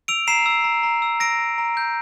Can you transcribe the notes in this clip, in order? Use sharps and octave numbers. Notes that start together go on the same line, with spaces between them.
E6 D7 F7
A#5 C7 E7
E6
A#5
A#5
E6
E6 A#6 D7
A#5
A#5
G6